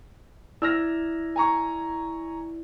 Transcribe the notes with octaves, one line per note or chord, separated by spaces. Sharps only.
E4 D5 E6 F6 A#6
G#5 A#5 C#6